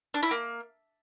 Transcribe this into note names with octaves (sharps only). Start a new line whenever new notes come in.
D4
E4
A#3